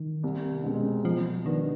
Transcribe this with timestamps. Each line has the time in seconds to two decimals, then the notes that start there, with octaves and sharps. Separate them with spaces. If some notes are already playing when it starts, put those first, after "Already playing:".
Already playing: D#3
0.23 C2
0.63 B2 G#3 C4
1.04 B2 F3
1.46 D#3 B3 D4